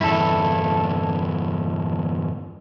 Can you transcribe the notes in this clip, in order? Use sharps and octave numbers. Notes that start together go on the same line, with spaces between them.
E2 G2 E4 A4